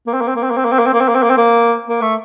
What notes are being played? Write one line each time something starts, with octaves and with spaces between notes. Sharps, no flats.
A#3
C4
A#3
C4
A#3
C4
A#3
C4
A#3
C4
A#3
C4
A#3
C4
A#3
C4
A#3
C4
A#3
A#3
A3